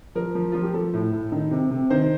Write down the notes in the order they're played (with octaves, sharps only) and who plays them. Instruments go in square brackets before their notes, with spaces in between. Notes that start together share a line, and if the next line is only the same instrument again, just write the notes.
[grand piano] F3 A#4
F3
F3 F4
G4
F3 A4
A2
A2
D#3
C3
C3
D#3 C5